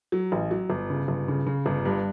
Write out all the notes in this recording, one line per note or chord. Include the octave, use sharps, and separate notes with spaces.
F#3
A1
F#3
G1
C#3
G1
C#3
C#3
G1
G2